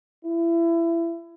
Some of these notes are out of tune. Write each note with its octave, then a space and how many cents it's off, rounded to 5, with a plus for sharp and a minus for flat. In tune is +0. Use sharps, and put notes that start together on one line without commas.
E4 +25